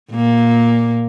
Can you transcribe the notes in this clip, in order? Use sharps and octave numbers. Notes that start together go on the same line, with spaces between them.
A#2 A#3